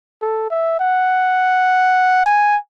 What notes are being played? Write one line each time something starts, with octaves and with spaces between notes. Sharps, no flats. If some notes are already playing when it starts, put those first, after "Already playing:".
A4
E5
F#5
G#5